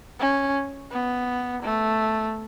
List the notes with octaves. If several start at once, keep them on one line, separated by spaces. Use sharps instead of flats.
C#4
B3
A3